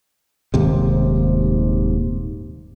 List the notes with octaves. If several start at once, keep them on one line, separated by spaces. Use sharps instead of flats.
D#1 D#2 G#2 C3